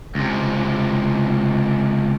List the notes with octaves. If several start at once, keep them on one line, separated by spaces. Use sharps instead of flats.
C#2 C3